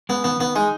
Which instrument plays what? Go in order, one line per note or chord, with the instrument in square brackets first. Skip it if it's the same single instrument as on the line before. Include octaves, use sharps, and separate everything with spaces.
[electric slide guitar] G#3 [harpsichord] B3
[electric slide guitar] D#3 [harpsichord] B3
[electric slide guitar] D#3 [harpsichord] B3
[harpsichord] G#3 [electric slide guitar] D#4